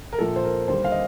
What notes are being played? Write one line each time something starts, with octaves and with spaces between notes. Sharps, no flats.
A#4
A#1 A#2 F3 A4
C5
A#4
D#2 D3 G3 C5
F5
D#5